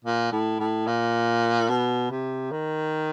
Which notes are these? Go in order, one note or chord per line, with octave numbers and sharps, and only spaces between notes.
A#2
A2
A2
A#2
B2
C3
D#3